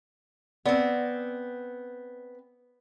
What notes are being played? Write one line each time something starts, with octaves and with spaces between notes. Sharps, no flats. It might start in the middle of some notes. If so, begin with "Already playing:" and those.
B3 C4 D5